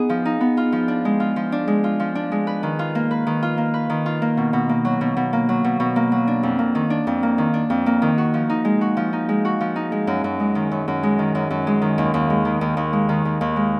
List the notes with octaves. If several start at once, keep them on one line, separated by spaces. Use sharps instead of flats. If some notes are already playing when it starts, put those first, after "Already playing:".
Already playing: B3 D#4 G#4
F3
D#4
B3
F4
F3
D4
G#3
F4
F3
D4
G#3
F4
F3
D4
G#3
B4
D#3
F4
A#3
B4
D#3
F4
A#3
B4
D#3
F4
A#3
B2
B2
A#3
F#3
B2
B2
A#3
F#3
B2
B2
A#3
F#3
D4
F2
A#3
D#3
D4
F2
A#3
D#3
D4
F2
A#3
D#3
F#4
F3
D#4
G#3
F#4
F3
D#4
G#3
F#4
F3
D#4
G#3
F#2
F#2
G#3
D#3
F#2
F#2
G#3
D#3
F#2
F#2
G#3
D#3
D#2
D#2
G#3
D#3
D#2
D#2
G#3
D#3
D#2
D#2
G#3